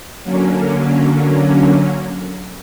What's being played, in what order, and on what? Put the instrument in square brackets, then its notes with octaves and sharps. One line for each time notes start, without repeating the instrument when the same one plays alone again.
[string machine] D3 F#3 A#3 C#4